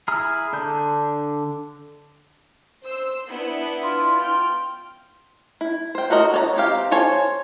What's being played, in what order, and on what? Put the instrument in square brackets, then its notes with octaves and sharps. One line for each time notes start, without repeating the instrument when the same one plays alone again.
[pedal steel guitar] E4 G#4 A#5 F6
D3 D4 G6
[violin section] C5 E6
B3 D4 E4
[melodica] F4
[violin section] G5 F6
[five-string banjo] E4
C5 G5
A3 F#4 A#4 D#5
C#5 D5 A#5
E3 C4 G4 F5
A4 C5 C#5 G#5